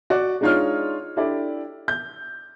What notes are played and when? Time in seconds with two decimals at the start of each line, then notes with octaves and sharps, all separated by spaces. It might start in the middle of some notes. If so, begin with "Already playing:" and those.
0.10 F#4 D5
0.41 G#3 D4 D#4 F4 C#5 F6
1.17 D4 E4 G4 A4 D5
1.88 G6